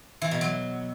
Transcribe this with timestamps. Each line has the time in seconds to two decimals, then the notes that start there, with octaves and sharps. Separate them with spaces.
0.22 E3
0.31 B2
0.41 F#3